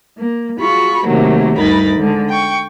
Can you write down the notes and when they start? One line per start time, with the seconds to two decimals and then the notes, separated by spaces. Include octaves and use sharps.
0.16 A#3
0.59 F4 F#4 G#4 B5 C#6
1.05 C3 D#3 F#3 G3 A3 A#3
1.57 D2 G2 D#4 A#4 B5 A6
1.98 D3 G#3
2.30 G5 C#6